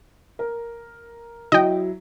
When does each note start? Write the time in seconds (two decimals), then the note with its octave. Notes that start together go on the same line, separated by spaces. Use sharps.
0.39 A#4
1.52 F#3 E4 D#5 G5